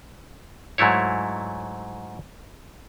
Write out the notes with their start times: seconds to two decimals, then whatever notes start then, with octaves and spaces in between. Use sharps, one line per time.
0.78 G#2 F#3 A3 E4 C#5